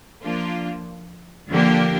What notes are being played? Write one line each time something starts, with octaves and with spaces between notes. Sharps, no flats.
F3 A#3 D4 F4
D3 F3 A#3 D4 G4